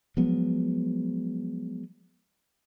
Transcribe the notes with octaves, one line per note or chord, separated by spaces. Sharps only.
F3 F#3 G#3 B3